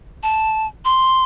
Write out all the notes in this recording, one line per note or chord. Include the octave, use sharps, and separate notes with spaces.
A5
C6